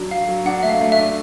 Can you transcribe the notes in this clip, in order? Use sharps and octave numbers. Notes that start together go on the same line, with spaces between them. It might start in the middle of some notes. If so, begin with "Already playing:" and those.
Already playing: F#3 D4
F#3 F5
F#3
D4 F#5
A3 E5
F5
A3
E5
D4